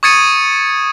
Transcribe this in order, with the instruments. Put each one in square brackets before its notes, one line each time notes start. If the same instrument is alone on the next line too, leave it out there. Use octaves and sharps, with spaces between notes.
[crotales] C#6 D#6 G#6 A6 C#7 D#7